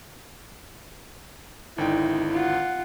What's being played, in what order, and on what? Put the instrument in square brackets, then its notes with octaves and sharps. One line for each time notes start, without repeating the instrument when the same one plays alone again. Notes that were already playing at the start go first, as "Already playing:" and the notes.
[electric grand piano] G#1 D3 G5 [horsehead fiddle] D#4 [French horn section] E4
[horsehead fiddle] F4 F#5